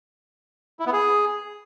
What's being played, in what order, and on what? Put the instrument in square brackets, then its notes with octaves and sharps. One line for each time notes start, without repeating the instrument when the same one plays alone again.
[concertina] E4
B3
G#4